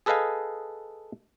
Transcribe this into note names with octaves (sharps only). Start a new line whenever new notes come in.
G#4 A4 B4 D#5 F5 G#5